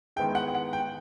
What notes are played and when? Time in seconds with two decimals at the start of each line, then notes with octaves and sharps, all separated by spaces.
0.16 D#3 G#3 B3 E4 G#4 G5
0.35 F#5
0.55 F#5
0.73 G5